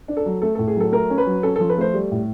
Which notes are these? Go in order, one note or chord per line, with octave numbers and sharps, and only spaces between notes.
D4
A4
F#3
A3 A4
A2 A4
G#4
F#3 A4
A3 A#4
C#4
B4
F#3
C#4 A4
F3 A4
B4
A3 C5
G3
A2